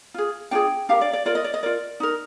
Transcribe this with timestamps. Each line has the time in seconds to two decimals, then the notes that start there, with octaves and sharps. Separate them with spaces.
0.14 F4 G#4
0.51 D4 F4 G#4 G5
0.89 D4 G4 A#4 F5
1.01 D5
1.13 D5
1.26 F4 A#4 D5
1.35 D#5
1.44 D5
1.54 D#5
1.63 F4 A#4 D5
2.00 D#4 A#4